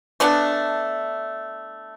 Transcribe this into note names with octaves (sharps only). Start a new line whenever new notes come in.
A3 B3 D4 F#5